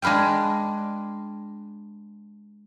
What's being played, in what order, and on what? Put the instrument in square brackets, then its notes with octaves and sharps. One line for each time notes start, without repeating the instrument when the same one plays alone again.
[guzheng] G#3 D4 B4 F5 G5